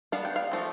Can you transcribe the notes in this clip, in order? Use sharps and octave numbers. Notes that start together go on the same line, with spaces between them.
G3 B3 D4 F5
G5
F5
F3 A3 C4